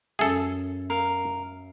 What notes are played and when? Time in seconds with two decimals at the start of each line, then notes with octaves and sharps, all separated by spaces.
0.19 F#2 G#4 A4 E5
0.90 A#4 F5